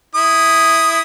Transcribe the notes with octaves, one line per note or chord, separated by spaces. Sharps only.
E4 D#6